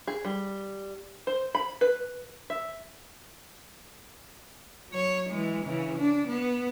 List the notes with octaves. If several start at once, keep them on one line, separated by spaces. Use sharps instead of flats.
G#4
G3
C5
B5
B4
E5
F#3 C#5
E3 G#3
C#3 E3
D4
B3